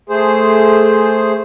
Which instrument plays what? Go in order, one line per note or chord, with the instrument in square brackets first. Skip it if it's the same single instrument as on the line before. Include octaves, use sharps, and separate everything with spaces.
[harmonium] A3 G#4 C5